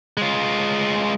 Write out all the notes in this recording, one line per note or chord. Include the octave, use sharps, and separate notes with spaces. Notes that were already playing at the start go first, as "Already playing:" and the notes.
G#3 F4